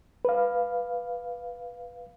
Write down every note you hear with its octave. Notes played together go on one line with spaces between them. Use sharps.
B4 F5